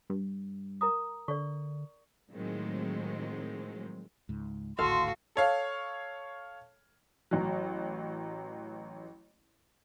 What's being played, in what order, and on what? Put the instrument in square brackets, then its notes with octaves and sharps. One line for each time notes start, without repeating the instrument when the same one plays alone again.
[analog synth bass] G2
[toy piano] A#4 A#5 D#6
[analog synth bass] D3 [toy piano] D5 C#6
[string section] A2 D#3 F3 F#3 G#3 C4
[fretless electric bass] C#2 G#2
[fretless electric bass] G#1 D2 A2 [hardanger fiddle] F#4 [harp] A4 F5 [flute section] C6
[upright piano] A4 C#5 F5
[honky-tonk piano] A1 F#3